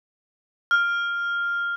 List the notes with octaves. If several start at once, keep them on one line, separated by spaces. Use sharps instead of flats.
F6